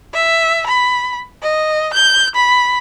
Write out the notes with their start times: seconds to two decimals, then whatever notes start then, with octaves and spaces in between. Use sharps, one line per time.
0.13 E5
0.67 B5
1.42 D#5
1.93 G6
2.35 B5